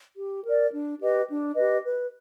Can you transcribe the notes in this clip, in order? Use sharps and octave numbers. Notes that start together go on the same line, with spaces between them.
G4
A#4 D5
D4
G4 B4 D#5
D4
G4 B4 D#5
B4